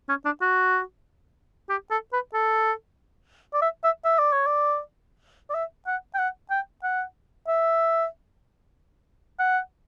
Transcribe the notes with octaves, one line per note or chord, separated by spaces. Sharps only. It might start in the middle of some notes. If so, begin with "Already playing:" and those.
C#4
D4
F#4
G4
A4
B4
A4
D5
E5
E5
E5
D5
C#5
D5
D5
E5
F#5
G5
F#5
G5
F#5
E5
F#5